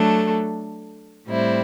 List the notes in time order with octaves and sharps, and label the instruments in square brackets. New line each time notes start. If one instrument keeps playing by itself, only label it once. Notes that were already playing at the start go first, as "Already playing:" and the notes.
Already playing: [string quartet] F#3 A3 D4 A4
A2 G3 C4 E4